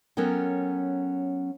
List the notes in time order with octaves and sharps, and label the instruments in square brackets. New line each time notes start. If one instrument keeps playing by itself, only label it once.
[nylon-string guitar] F#3 B3 C#4 A4 A#4 G5